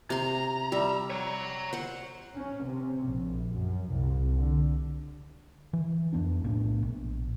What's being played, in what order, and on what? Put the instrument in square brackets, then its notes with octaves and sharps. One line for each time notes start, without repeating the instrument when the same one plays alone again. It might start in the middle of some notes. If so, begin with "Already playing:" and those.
[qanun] C3 C6 [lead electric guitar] A#5
[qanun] G3 E5
[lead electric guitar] C#5 A#5
[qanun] C5 F#5
[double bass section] C#4
C3
A#1
F#2
C2
D3
[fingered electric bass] E3
F2 B3 D4
B1 A2 B3 D4
A#1